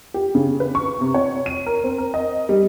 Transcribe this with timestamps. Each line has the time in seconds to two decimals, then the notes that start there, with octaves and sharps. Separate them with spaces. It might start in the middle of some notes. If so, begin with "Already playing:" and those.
0.14 G4
0.35 C#3
0.60 B4
0.75 C#6
1.01 C3
1.14 C#5
1.46 D#7
1.66 A#4
1.84 C4
1.98 A#4
2.14 D#5
2.49 G3